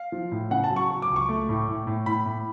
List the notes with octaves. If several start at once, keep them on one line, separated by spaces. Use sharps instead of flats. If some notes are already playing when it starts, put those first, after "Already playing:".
Already playing: F5
F3
A2
C#3 F#5
A5
F#3
C#6
F#3
D6
C#2
C#6
A3
A2
A2
A2
A2 B5
A2